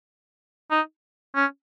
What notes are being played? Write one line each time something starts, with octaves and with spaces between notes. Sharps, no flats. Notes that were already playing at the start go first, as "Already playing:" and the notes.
D#4
C#4